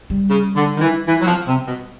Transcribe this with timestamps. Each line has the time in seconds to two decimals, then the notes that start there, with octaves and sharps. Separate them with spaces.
0.10 G3
0.29 C#3
0.56 D3
0.77 D#3
0.81 E3
1.08 E3
1.21 F#3
1.27 F3
1.47 C3
1.66 B2